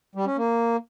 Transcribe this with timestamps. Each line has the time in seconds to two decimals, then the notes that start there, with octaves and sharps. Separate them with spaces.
0.15 G3
0.26 C#4
0.37 A#3